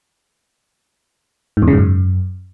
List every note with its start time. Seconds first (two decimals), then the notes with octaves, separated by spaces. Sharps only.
1.57 G#2
1.62 E2
1.68 C#3
1.73 G#2
1.78 F#2